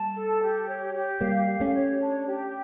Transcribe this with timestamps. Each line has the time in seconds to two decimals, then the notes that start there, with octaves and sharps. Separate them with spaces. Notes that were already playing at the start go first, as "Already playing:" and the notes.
Already playing: G3 A#3 A5
0.15 A4
0.42 G4
0.68 C#5
0.94 G4
1.21 G3 A#3 F5
1.47 G4
1.60 A3 C#4
1.74 C#5
2.00 D4
2.27 G4